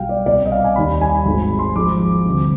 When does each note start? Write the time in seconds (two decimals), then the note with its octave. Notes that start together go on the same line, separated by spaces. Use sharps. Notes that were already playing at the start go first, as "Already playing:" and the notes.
Already playing: B1 B2 G3 F5 G5
0.09 D5
0.26 C2 B2 G3 D5
0.45 D#5
0.52 F5
0.64 G#5
0.76 D#2 D#3 G3 B5
1.01 G#5
1.26 G#1 G#2 D#3 G#3 B5
1.42 B5
1.59 C6
1.76 G#1 G#2 F3 G#3 D6
2.25 D2 C3 G3